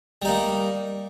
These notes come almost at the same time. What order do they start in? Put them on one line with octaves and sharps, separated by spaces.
G3 D#4 A#3